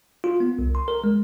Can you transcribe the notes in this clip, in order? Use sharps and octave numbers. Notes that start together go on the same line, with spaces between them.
F4
B3
C2
C6
A#4
G#3